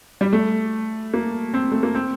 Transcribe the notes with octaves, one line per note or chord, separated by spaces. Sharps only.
G3
A3
A#3
C4
A3
A#3
C4